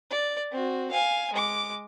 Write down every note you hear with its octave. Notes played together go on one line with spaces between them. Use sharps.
D5
C4 F#4
F5 G#5
G#3 D6